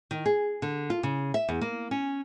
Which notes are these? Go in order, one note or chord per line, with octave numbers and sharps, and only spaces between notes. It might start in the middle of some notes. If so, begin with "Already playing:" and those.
D#3
G#4
D3
F4
C#3
E5
E2
A#3
C#4